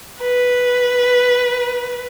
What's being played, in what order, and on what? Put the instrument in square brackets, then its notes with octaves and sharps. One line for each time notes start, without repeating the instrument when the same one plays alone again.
[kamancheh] B4